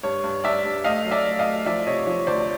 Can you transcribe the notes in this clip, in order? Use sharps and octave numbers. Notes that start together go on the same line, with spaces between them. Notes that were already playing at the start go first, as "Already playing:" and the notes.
G2 C#5
G2
G2 D5 E5
G2
A3 D#5 F5
F#3
D5 E5
A3
D#5 F5
A3
F3 D5 E5
C3 C#5 D#5
F3 C#5
D2 C5 D5